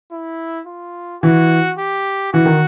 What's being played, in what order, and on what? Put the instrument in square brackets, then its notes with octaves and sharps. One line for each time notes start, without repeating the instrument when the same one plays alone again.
[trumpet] E4
F4
[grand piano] E3 [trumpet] F#4
[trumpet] G4
[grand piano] E3 [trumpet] F#4
[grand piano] D#3